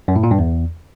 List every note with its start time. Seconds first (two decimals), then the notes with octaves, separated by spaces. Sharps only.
0.08 F#2
0.16 A2
0.23 A#2
0.31 G2
0.39 E2